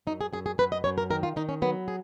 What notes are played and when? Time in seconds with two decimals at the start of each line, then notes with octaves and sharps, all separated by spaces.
0.07 F#2 D#4
0.21 G#4
0.33 F#2 G#4
0.46 G#4
0.58 F#2 B4
0.72 D#5
0.84 F#2 C#5
0.98 A#4
1.10 D#3 A#4
1.23 F4
1.36 D#3 D#4
1.49 C#4
1.62 F#3 B3
1.88 G#4